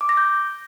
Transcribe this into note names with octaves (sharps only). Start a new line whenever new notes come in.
D6
A#6
G6